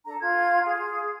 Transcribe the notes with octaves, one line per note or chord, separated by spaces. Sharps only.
D4 A4 A#5
F4 G#6
G#4